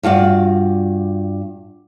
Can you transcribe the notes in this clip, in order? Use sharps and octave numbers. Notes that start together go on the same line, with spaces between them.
G2 F4 F#4 D5